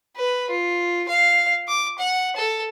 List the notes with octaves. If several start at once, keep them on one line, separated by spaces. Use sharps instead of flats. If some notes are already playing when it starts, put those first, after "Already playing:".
B4
F4
F5
D6
F#5
A4